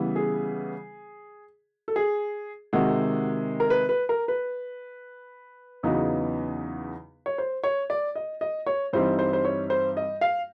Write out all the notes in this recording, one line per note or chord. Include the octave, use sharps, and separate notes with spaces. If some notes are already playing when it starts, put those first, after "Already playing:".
Already playing: C#3 E3 G3 B3
G#4
A4
G#4
C3 D#3 G#3 F#4
A#4
B4
B4
A#4
B4
E2 C#3 F#3 B3 D#4
C#5
C5
C#5
D5
D#5
D#5
C#5
G2 E3 G3 C4 D#4 C5
C5
C5
C#5
C5
D#5
F5